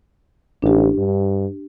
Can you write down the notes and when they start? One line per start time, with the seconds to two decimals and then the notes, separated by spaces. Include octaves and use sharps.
0.62 A1 D4 G4
0.98 G2